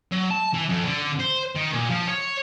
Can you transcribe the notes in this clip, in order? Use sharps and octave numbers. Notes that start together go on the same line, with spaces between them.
F#3
A5
E3
F2
D3
C5
D#3
A#2
F3
C#5